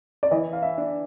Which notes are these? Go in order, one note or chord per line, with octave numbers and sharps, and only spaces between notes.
D5
E3 D#5
F5
E5
D4